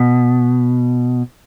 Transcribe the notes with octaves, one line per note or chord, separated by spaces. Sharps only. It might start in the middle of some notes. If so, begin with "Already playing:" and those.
Already playing: B2